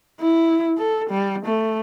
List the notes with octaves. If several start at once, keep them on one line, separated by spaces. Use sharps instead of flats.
E4
A4
G3
A3